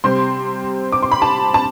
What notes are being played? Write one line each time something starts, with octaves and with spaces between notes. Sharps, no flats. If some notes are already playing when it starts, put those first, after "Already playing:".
C3 G3 C4 C6
D6
C6
B5
A5
A5